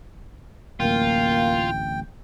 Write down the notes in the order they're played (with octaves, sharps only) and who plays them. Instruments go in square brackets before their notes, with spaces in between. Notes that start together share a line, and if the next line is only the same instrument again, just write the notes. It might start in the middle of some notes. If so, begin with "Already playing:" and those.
[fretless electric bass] D1 A1 [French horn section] A#3 [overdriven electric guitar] F4 [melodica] G5